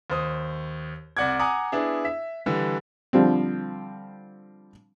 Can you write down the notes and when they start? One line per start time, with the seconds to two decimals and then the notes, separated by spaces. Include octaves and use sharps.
0.10 D#2 C5 D#6
1.17 C2 D5 F#5 D6 G#6
1.39 F#5 G#5 A#5 D6 D#6
1.72 B3 D4 E4 G#4
2.05 E5
2.46 D3 E3 G3
3.13 D3 F3 G3 C4